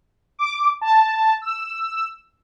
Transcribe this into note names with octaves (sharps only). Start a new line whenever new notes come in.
D6
A5
E6